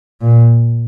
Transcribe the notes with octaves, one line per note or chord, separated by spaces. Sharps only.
A#2